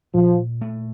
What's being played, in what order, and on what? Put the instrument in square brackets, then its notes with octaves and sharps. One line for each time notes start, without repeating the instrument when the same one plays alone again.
[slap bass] A#2 [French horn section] F3
[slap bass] A3